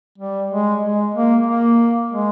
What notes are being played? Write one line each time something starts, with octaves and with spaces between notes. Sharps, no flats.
G3
G#3
G#3
A#3
A#3
G#3